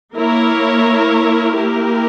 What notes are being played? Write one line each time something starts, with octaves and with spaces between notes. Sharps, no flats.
A#3 E4 A#4 C#5
A#3 E4 G4 A#4